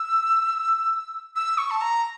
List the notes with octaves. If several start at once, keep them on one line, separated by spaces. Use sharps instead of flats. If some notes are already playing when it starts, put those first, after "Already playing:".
Already playing: E6
E6
C#6
A5
A#5